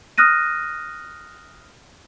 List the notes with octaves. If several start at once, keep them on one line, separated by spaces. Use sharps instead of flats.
D#6 F6 F#6 A#6 D#7